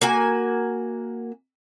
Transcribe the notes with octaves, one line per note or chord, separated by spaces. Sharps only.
A#3 F#4 G#5